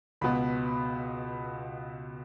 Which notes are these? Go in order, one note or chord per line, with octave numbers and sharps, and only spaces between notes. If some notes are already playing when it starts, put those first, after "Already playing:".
C#2 B2 B3 B5